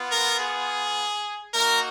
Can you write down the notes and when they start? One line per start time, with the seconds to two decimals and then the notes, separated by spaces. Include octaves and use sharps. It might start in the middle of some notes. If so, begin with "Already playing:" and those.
Already playing: B3 F4
0.12 A#4
0.40 G#4
1.53 A#3 D#4 F#4 A#4